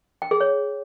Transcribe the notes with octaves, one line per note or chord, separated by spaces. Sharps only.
G5
G#4
C#5